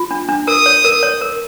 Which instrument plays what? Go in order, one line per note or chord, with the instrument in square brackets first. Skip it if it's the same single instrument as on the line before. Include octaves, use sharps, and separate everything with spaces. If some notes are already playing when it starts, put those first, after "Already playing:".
Already playing: [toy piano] F4
D4
D4
[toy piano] A#4 [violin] D#6
[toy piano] C#5
A#4
C#5
A#4